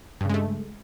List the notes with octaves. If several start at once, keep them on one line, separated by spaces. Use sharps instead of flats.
G2 C#3 G#3 A3